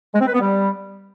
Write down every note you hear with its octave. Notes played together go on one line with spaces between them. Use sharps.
G#3
C4
B4
B3
G3